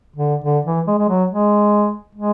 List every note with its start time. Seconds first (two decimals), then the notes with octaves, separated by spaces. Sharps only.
0.16 D3
0.44 D3
0.65 E3
0.87 G#3
0.98 G#3
1.09 F#3
1.30 G#3
2.15 G#3